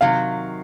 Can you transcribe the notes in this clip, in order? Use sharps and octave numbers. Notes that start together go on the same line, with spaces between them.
C3 D#3 F#3 F5